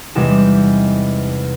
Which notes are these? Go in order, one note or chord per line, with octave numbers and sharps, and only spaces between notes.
E2 C3 G3 G#3 D#4 E7